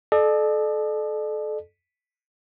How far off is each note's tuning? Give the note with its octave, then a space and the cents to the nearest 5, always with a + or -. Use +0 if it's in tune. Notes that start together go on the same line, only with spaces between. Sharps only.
A4 -30 D5 +40